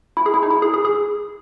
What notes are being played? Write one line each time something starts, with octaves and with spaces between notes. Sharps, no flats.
E4
G#4
E4
D#4
E4
G#4
G#4
G#4